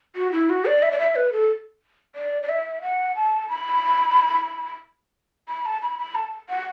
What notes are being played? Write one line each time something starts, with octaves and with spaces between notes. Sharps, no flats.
F#4
E4
F#4
D5
E5
D5
E5
B4
A4
D5
D5
E5
F#5
A5
B5
B5
A5
B5
B5
A5
F#5